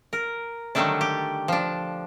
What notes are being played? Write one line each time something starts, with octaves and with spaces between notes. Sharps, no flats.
A#4
D3 D#3 F#3 G3 A3 D4
G4
F3 D4